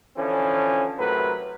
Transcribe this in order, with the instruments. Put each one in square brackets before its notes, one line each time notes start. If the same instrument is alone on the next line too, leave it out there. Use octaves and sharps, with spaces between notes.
[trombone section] D3 E3 F3 C#4
A2 C3 F#3 A#4 B4